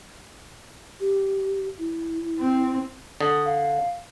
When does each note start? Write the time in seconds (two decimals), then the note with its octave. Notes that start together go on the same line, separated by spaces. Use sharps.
1.00 G4
1.78 E4
2.39 C4
3.21 D3 D#6
3.46 F5